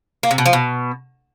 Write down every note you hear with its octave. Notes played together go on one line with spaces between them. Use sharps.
A#3
C3
B2
F3
B2